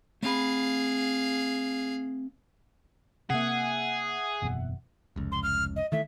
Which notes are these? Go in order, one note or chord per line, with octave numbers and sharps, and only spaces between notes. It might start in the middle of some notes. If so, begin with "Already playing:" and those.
A3 C4 G#4 F5 B5
C3 A#3 G#4 E5 F#5
F#1 E2 B2
F1 C#2
C6
F6
D#5
D#3 E3 A3 E5